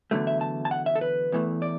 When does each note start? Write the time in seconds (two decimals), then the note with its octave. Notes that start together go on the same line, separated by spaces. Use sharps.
0.11 E2 D3 F#3 A3
0.27 E5
0.41 A5
0.65 A5
0.71 F#5
0.86 E5
0.95 A4
1.01 B4
1.32 E2 E3 A3
1.62 D5